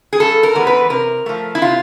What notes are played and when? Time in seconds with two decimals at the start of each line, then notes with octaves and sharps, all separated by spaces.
0.13 G#4
0.20 G2 A4
0.43 A#4
0.55 E3 G#3 B3
0.67 B4
0.90 C3 A#4
1.26 F3 A3
1.55 E4
1.61 C3 F4